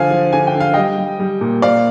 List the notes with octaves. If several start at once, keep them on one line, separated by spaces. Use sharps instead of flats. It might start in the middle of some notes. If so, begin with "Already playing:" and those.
Already playing: D3 F3 F5 G#5
F3
D3 G#5
G5
D3
F5
G3 D#5 G5
G3
G3
A#2
A#2 D5 F5